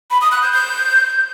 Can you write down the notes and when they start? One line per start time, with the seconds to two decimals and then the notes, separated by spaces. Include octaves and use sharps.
0.11 B5
0.21 D#6
0.32 F#6
0.42 G6
0.53 G6